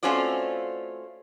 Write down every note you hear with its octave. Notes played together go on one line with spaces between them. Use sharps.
A3 C4 C#4 F4 F#4 D5